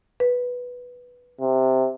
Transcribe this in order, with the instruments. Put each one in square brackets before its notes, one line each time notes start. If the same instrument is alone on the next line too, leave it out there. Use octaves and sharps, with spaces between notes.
[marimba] B4
[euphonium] C3